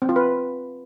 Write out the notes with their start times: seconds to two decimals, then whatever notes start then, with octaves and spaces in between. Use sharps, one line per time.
0.02 C4
0.09 F4
0.16 B4